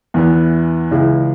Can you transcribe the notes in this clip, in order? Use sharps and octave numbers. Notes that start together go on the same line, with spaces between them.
E2 E3 B3
C#2 C#3 E3 G#3 E4